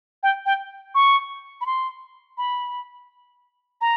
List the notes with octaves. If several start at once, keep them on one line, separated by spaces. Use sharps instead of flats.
G5
G5
C#6
B5
C6
B5
A#5